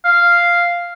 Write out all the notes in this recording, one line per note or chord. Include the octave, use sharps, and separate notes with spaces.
F5